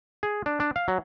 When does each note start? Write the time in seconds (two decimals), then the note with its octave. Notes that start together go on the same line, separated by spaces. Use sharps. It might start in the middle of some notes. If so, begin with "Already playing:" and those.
0.23 G#4
0.46 D4
0.60 D4
0.76 F5
0.88 F#3